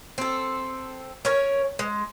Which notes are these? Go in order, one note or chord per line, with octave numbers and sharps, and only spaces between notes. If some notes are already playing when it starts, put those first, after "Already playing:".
C4 A4
C#4 A#4 C#5
G#3